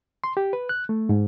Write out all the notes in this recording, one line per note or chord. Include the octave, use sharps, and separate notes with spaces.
C6
G4
B4
F#6
A3
G#2